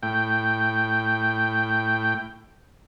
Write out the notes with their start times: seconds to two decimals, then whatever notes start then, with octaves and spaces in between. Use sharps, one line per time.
0.03 A2 G5